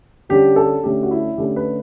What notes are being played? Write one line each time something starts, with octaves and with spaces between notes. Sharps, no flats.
D3 G3 C#4 G4
A4
D3 A3 C#4 G4
F#4
E4
D3 A3 C#4 G4
B4